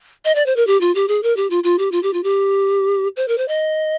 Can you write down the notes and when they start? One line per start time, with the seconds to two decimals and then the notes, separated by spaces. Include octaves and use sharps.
0.25 D#5
0.35 D5
0.46 C5
0.56 A#4
0.67 G4
0.81 F4
0.95 G4
1.08 G#4
1.23 A#4
1.36 G4
1.50 F4
1.64 F4
1.79 G4
1.92 F4
2.03 G4
2.13 F4
2.23 G4
3.17 C5
3.28 A#4
3.38 C5
3.48 D#5